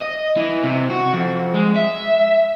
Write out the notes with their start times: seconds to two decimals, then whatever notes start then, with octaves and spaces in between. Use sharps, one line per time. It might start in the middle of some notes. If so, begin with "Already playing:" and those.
0.02 D#5
0.37 E3
0.64 C3
0.90 F#4
1.13 F2
1.54 G#3
1.76 E5